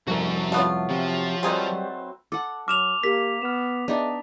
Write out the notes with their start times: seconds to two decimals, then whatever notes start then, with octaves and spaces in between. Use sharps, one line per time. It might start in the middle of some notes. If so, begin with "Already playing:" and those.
0.07 C2 F2 A3 F#4 A#4
0.52 F#3 A3 B3 F4
0.90 C3 F3
1.43 F#3 G3 C4 D#4 G#4 B4 C5
2.32 A4 F#5 D6
2.68 F#3 D6 E6 F6 E7 F7
3.03 A#3 G4 A#4 B6
3.42 B3 F6 E7
3.88 B3 D4 D#4 G#4 D#5 E5